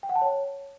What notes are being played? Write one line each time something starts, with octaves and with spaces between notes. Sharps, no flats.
G5
F#5
A5
C#5